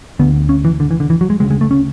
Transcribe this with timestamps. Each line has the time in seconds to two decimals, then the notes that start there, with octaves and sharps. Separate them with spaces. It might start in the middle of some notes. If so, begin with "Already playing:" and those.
0.19 D2 D3 B3
0.49 C#4
0.65 E3
0.80 D3
0.91 E3
1.00 D3
1.10 E3
1.21 F#3
1.30 G#3
1.40 D2 C#3 G#3
1.51 G#3
1.61 A3
1.71 C#4